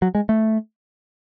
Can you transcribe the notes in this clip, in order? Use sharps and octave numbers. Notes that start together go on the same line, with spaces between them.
F#3
G#3
A3